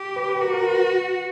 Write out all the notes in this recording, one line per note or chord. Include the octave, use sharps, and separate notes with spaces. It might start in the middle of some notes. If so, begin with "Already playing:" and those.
Already playing: G4
B4
B4
F#4 A#4
A#4
B4